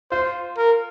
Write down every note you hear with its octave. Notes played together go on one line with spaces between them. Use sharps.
F4 C5
A#4